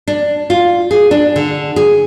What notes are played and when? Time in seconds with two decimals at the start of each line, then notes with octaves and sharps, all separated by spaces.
0.07 D4
0.50 F4
0.91 G#4
1.11 D4
1.36 D3
1.76 G#4